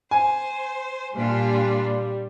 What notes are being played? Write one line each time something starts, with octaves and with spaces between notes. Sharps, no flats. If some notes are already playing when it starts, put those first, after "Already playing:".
C5 G#5
A#2 G3 D4 F4